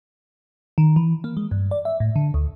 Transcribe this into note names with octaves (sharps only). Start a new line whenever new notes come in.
D#3
E3
A#3
G#3
G2
D5
E5
A2
D3
D2